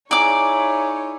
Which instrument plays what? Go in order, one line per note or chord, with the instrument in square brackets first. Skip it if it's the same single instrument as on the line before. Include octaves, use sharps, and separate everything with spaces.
[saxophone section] D#4 E4 G#4 [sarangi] C#5 [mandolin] D5 D6 [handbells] G#5 A#5